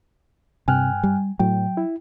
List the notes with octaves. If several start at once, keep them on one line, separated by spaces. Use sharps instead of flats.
G2 C3 G5 G#5 F6 F#6
G3
A2 F#3 G5
E4